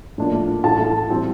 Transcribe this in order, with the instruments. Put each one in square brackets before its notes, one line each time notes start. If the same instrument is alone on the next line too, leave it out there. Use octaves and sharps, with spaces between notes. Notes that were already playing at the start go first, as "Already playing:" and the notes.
[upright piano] A2 F3 A#3 D4
A2 E3 A3 A5
E3 G3 C4